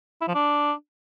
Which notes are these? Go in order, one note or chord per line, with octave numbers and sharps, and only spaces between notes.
E4
F3
D4